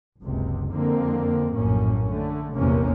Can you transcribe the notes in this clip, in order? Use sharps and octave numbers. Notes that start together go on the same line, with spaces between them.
F#1 C#2 C3
F2 D3 A#3 C4
A#1 F#2 A2 A#3 C#4
D3 A3
F1 A#1 E2 C3 A#3 C#4